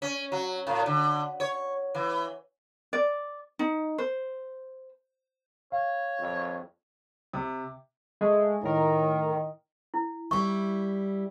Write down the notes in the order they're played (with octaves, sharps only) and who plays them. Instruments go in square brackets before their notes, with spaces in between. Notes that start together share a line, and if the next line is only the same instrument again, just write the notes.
[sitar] C#4
F#3
A2
D3
C#5
E3
[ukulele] D5
D#4
C5
[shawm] C#5 [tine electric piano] F5
[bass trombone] F2
[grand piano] C3
[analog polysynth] G#3 A3
[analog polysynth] A2 A#4 [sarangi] D#3
[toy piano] E4
[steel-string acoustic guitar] G3 E4 [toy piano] C#6